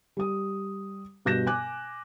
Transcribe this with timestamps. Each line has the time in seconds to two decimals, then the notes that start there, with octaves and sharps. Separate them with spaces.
0.17 G3 D#6
1.25 G2 B2 F#6 G6 A#6 E7
1.47 G#5 D6 F#6